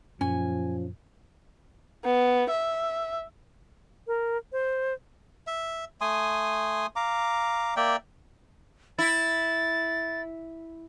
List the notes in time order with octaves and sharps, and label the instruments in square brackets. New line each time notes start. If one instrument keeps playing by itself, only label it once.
[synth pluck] F#2 A#2 [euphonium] F3 [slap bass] C#4 [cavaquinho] G#5
[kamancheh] B3
E5
[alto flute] A#4
C5
[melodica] E5
A3 G#5 C6 D#6
F5 A#5 D6
A#3 D5 E5 G5
[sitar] E4 [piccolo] A6